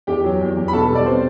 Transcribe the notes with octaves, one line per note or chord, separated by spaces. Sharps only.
E2 G4 G5
F#3
E2
E2
B5
B2 A4 A5
G3
D5
B2 C4 C5